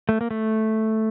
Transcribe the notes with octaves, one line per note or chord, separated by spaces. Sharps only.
A3
A#3
A3